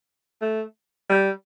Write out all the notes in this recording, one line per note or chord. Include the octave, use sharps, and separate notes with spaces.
A3
G3